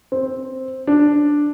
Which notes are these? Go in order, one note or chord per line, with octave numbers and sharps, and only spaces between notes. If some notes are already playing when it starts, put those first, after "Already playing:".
C4
D4